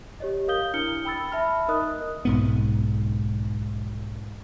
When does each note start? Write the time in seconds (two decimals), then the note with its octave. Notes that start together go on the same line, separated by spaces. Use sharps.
0.20 G4 C#5 D#5
0.48 A#4 F5 D#6 G6 G7
0.74 D4 E4 F6 C#7 G7
1.05 G5 B5 E6 A6
1.32 E5 A5 B5 F6
1.68 D#4 A#4 D#5 D#6 F#6
2.25 B1 G#2 B3